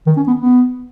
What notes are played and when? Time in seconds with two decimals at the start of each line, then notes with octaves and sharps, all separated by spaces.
0.07 D#3
0.17 C#4
0.27 B3
0.37 B3